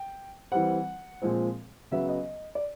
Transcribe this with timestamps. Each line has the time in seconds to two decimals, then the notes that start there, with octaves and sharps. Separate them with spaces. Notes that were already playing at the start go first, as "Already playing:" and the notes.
Already playing: G5
0.52 E3 G3 C4 F#5
1.22 A#2 F3 G#3 C4
1.91 C#3 F#3 B3 E5
2.09 D#5
2.55 D5